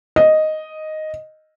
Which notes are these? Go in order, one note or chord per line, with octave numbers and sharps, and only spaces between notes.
D#5